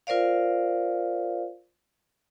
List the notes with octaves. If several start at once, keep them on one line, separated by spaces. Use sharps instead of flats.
F4 A#4 C5 D5 F5